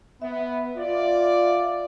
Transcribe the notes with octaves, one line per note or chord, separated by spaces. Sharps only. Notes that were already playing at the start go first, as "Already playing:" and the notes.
B3 E5
F4 D5 E5